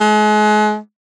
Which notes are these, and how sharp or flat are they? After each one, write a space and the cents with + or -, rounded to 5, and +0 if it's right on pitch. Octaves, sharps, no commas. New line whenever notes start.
G#3 +35